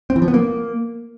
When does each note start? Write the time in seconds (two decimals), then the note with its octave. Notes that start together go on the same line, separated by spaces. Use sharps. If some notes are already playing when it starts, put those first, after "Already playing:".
0.10 C4
0.16 E3
0.22 F3
0.28 B3
0.34 A#3